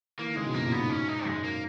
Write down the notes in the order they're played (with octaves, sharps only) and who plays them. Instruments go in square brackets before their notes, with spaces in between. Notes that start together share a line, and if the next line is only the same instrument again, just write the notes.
[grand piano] E3 [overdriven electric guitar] A#3
[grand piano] D#3
[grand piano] C#3 [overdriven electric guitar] G#3
[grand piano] B2
[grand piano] F#2 [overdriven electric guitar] A#3
[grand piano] A#2
[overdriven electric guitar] B3
[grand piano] G#2
[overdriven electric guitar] C#4
D#4
[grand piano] F#2 [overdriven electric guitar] G#3
[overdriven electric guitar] A#3